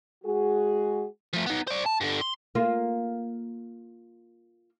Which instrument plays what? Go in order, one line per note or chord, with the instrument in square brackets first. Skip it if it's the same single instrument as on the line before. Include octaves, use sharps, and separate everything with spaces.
[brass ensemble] G#3 F#4 G#4
[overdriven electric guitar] F3 A3
B3 D#4
C5 D5
A5
G2 D3
C6
[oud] A#3 F4